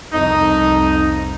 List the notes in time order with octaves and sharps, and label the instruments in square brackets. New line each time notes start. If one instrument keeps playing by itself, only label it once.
[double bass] C2 F2 [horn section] D#4